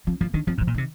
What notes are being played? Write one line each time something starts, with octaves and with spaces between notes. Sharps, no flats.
F3 C4
F3 A#3
D#3 D4
F3 C4
G#2
F3
A#2
C3 D#3